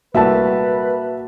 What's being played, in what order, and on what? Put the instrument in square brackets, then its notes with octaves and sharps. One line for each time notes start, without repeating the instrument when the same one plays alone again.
[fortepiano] C2 A3 E6 [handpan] A#3 F#4 [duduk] B4 [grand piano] E5 A5